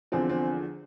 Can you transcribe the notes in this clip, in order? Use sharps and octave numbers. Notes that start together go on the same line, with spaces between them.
E2 D3 F3 C4
C4